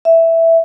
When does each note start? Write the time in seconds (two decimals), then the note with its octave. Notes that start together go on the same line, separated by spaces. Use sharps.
0.05 E5